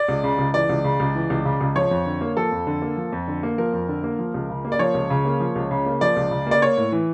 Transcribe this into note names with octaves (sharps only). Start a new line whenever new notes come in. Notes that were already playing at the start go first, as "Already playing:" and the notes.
Already playing: D5
C#2
C#3
C#2
E3 D5
C#2
C#3
C#2
E3
C#2
C#3
C#2
F3 C#5
F2
D3
A#3
F3 A4
F2
D3
A#3
F3
F2
D3
A#3
F3 A#4
F2
D3
A#3
F3
C#2
C#3
A#3
D5
F3 C#5
C#2
C#3
A#3
F3
C#2
C#3
A#3
F3 D5
C#2
C#3
A#3 D5
A#3 C#5
A2
E3